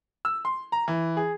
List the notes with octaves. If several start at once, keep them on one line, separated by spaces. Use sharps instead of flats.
E6
C6
A#5
E3
G#4